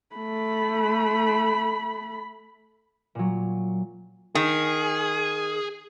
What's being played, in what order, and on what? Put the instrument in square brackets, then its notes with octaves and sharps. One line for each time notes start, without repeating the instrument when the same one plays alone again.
[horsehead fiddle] A3 B5
[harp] A#2 F#3
[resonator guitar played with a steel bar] D#3 [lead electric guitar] G#4